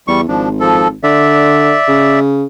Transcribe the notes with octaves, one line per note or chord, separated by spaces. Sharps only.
E2 G3 C#6
G#1 F3 D4
F3 A4
D3 D5 E5
C#3